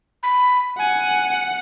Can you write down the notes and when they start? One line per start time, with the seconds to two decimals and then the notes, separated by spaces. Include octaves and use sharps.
0.23 B5
0.79 F#5 G#5